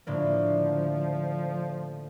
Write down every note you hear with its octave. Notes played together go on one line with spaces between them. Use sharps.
A2 D3 F3 A#3